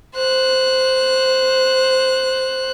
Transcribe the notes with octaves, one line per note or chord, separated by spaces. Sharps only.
C5 F#6